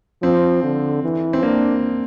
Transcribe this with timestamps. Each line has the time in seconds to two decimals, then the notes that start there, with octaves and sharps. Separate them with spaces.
0.22 F3 C4
0.63 D3
1.04 E3
1.33 C4
1.43 A#3 D4